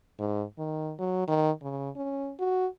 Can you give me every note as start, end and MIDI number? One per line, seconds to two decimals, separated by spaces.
0.19 0.44 44
0.58 0.94 51
0.99 1.25 54
1.28 1.51 51
1.62 1.90 49
1.96 2.33 61
2.40 2.66 66